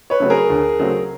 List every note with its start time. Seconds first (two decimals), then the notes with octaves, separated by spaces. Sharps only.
0.10 B4 C#5
0.20 C#3 F#3 A3 C4
0.30 G#4 A#4
0.50 D2
0.79 C#3 F#3 A3 C4